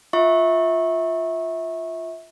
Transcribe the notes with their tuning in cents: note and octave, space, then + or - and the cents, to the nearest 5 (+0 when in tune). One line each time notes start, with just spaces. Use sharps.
F4 +0 E5 -25 C#6 -20